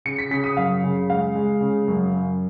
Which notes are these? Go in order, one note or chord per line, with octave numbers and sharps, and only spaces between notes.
C#3 C#7
B6
C#3 B6
D#6
F#2 F5
C#3
G#3 F5
G#3
C#3
F#2
F#2